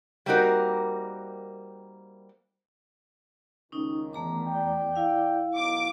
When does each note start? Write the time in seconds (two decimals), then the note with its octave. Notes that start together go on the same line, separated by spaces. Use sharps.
0.26 G3 A#3 C4 D#4 F#4 A#4
3.72 C#2 D#3 C#4 D#4
4.13 E2 A3 A#5 D6
4.46 D5 G5
4.96 E4 F5
5.55 B2 D#3 F#3 D6